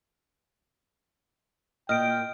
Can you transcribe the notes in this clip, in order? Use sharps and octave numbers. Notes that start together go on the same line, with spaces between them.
A#2 D#5 G5 F6 D7